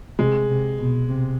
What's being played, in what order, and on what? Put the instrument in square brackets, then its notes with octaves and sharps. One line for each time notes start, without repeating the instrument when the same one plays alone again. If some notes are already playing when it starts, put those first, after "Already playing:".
[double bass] C3 [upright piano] G#3
[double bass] C3
B2
C3